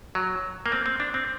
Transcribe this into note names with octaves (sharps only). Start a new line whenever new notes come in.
F#3
A#3
C4
C4
D4
C4